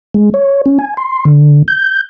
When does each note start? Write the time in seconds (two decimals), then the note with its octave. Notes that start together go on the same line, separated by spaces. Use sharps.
0.14 G#3
0.34 C#5
0.66 C#4
0.79 G#5
0.97 C6
1.25 D3
1.68 G6